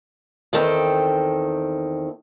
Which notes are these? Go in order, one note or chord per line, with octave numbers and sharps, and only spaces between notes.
E2 D#3 C4 A4 G5